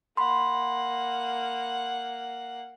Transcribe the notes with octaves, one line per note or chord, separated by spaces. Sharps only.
A#3 F#5 B5 C6